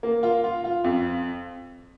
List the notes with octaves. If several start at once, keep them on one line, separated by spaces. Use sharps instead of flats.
A#3
F4
F4
F4
F2